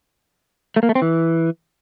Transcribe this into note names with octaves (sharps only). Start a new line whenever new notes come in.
A3
A#3
A3
C4
E3